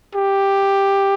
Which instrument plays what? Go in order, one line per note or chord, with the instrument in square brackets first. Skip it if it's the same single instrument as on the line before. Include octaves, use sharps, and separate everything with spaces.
[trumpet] G4